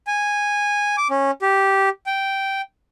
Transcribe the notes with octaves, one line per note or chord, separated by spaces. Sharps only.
G#5
D6
C#4
G4
G5